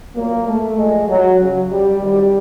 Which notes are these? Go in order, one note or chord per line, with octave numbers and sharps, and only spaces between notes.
A#2 F#3 A#3
A3
A#2 F3 G#3
F#3
C#3 F#3
G3
C3 D#3 F#3 G3